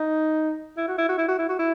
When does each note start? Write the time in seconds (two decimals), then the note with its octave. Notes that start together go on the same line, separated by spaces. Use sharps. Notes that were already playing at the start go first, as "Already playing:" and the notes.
Already playing: D#4
0.77 E4
0.88 F#4
0.98 E4
1.08 F#4
1.18 E4
1.28 F#4
1.38 E4
1.49 F#4
1.59 E4